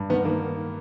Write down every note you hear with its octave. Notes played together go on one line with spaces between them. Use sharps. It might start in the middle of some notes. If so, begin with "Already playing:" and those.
Already playing: G2
D#3 B3
D#3 A#3